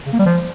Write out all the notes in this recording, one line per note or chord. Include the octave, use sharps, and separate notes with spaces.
C#3
A#3
G3
F3